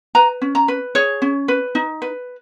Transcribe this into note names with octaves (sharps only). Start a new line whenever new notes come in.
B4 A#5
C#4
A#5
B4
G#4 C#5
C#4
B4
D#4
B4